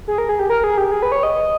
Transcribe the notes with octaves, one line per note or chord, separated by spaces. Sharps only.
G#4
A#4
G#4
G4
A#4
G#4
G4
G#4
B4
C#5
D#5